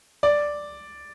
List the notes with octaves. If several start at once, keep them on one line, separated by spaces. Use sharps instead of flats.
D5